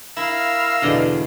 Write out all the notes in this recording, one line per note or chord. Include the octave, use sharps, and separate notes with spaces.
E4 A#4 E5 F5 E6
E2 B2 D3 D5 D#5 G#5